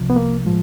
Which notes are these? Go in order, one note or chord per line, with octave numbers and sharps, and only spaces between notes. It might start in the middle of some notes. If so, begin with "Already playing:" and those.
Already playing: C2 C3 F3
B3
A#3
A2 F3 G#3